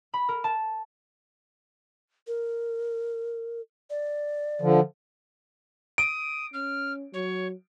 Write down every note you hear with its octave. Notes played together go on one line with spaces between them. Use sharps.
B5
A#4
A5
A#4
D5
D3 F3
D#6 D7
C#4 F6
F#3 C#5